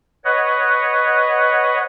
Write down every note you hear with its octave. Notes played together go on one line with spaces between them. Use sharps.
B4 C#5 D#5 F#5